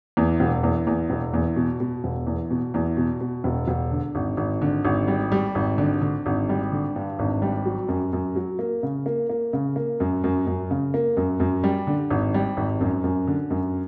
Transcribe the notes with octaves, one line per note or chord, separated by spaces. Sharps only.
E2
E1
E2
E2
E1
E2
B2
B2
E1
E2
B2
E2
B2
B2
E1
E1
D3
G#1
G#1
D3
G#1
G3
G3
G#1
D3
D3
G#1
G3
D3
G2
G#1
G3
F#3
F#2
F#2
F#3
A#3
C#3
A#3
A#3
C#3
A#3
F#2
F#2
F#2
C#3
A#3
F#2
F#2
G3
D3
G#1
G3
G#1
F#2
F#2
D3
F#2